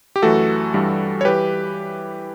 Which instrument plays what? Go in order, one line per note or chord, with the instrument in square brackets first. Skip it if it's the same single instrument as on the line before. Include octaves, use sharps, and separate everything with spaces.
[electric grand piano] G4
F#2 E3 A3 F#4 A4
G2 E3 G3
C#5
E3 G3 G4 B4